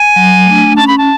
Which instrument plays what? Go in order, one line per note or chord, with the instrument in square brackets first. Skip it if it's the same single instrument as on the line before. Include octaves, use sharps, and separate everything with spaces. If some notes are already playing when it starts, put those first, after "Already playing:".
Already playing: [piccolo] G#5
[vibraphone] F#3
A3 D4
[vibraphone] C#4 [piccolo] A5
[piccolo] B5
A5